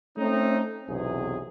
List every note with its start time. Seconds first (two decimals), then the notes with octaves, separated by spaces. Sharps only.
0.18 A3 C4 C#4 D#4
0.89 B1 E2 C3 G#4